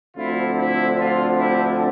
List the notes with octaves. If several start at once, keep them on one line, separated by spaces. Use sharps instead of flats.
D2 D3 F3 C4 E4 F4
E4
F4
E4 G4